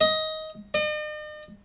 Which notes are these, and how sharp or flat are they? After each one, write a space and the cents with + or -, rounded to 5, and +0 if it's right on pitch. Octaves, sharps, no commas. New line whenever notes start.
D#5 +15
D#5 -45